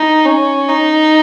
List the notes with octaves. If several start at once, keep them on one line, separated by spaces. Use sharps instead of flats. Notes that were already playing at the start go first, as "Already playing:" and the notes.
Already playing: D#4
C#4
D#4